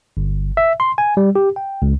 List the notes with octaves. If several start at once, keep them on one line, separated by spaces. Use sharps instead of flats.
G1
E5
C6
G#5
G3
G4
G5
C#2